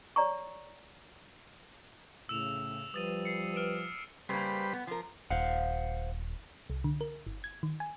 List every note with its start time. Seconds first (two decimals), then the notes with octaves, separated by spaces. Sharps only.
0.16 C#5 D5 A#5 C#6
2.29 A2 C#3 E6 E7 F7
2.94 F3 G3 B4 D#6 A6 D#7
3.25 C7 C#7
3.55 F6 D7 E7
4.29 C#3 G3 A#3 B4 C5
4.73 B3
4.87 F3 A#4
5.30 D#1 C5 F5 F#5
6.70 C2
6.84 D3
7.01 A#4
7.27 G1
7.44 G#6
7.63 D#3
7.80 G#5